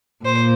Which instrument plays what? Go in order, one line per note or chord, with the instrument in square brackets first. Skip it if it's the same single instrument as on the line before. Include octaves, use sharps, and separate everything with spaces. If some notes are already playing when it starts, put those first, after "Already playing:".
[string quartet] A#2 C5